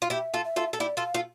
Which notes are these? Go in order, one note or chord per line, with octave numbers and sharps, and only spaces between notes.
F4
E4 G4 E5
F4 A4
E5
F4 A4
A4
E4 G4 D5
F4 A4
F5
F4 A4